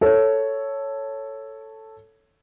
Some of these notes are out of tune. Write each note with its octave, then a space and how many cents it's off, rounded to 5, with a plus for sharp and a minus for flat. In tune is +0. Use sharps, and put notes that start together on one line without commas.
A4 +0 C#5 +0